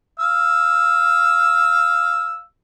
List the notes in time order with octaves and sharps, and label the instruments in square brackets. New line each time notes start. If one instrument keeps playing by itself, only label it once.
[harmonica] F5 E6